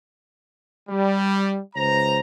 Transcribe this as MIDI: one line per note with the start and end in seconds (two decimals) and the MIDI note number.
0.90 1.59 55
1.76 2.20 37
1.76 2.20 72
1.76 2.20 82